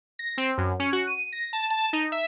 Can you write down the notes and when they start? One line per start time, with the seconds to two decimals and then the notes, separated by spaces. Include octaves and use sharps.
0.19 A#6
0.38 C4
0.58 F#2
0.80 C#4
0.93 F#4
1.07 D#7
1.33 A#6
1.53 A5
1.70 A5
1.93 D#4
2.12 E5